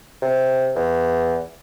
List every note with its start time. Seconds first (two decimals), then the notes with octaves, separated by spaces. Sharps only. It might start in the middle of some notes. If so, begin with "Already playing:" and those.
0.22 C3
0.76 E2